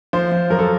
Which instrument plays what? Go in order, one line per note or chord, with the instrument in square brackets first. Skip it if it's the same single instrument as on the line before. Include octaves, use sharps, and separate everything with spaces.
[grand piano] F3 C5
F3
F#2 A#4
A4